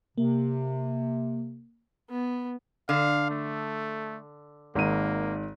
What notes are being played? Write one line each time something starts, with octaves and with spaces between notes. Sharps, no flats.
C3 A#3
B3
D3 F5
A3
G#1 A#3 D#4 D#7